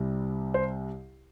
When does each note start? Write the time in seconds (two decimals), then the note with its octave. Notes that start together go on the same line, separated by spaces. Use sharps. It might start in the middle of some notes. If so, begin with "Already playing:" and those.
Already playing: C2 C3 G3
0.54 C5